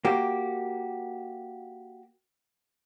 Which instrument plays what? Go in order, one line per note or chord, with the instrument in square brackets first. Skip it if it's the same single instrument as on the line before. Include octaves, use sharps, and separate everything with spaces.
[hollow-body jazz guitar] A#3 F#4 G4